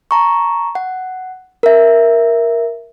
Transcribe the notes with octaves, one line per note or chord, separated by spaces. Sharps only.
A5 A#5 C#6
F#5
A#4 E5